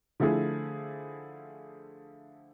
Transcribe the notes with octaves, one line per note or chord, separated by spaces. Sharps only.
D3 F3 A3 E4 G#4